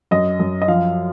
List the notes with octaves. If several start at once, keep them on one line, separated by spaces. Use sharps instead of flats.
F#2 D#5
F#2
D#5
F3 F5